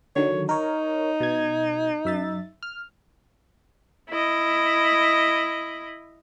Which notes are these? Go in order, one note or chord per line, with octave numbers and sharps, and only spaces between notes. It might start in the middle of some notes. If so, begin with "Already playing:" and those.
D3 D#3 F#3 C#5
D#4 A#4 C#5
B2 G#6
F#2 E5 A6
F6
E4 D#5